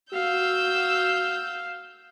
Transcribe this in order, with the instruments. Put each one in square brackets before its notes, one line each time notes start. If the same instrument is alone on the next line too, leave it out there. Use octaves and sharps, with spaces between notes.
[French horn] F#4 [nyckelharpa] F5 [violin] E6 G6